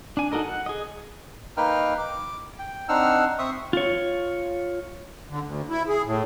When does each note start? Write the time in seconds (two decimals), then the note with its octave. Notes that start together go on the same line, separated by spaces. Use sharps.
0.17 D4 G#5
0.32 D#4 F#4 A4 A#4 D#5
0.44 F#5
0.66 G#4 D#5
1.57 A#3 D#4 B4 G5 F6
1.98 D6
2.59 G5
2.89 C4 D4 D#4 F#5 E6 F6
3.39 C4 E5 C#6 D#6
3.73 F4 C#5
5.30 D3
5.45 D2
5.70 E4
5.88 G#4
6.04 A2